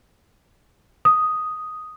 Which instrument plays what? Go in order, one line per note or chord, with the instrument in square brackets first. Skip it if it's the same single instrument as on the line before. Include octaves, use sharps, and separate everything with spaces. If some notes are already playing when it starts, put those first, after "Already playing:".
[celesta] D#6